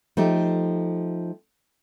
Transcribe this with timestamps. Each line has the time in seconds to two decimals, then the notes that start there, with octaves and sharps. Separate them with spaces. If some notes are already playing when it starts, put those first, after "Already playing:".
0.17 F3 A3 D#4 G4